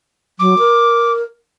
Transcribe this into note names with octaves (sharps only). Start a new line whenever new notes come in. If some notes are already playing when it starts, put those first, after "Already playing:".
F#3 D6
A#4